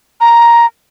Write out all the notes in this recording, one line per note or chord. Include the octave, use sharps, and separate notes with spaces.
A#5